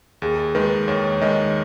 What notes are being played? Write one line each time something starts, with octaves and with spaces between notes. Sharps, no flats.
D#2 G#4
D#3 G#3 B4
D#2 C#5
D#3 G#3 D#5